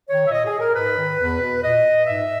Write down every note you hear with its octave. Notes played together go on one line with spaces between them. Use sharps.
D#3 C#5
E5
A#2 D#5
G#4
A#4
G#2 B4
D#3
E2
B2
A#2 D#5
G#2 E5